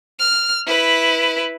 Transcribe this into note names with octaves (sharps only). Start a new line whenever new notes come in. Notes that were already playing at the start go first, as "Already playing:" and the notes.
F6
E4 B4